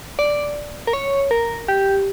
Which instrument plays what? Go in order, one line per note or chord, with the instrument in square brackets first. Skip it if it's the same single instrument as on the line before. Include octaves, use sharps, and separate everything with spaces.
[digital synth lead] D5
A#4
C#5
A#4
G4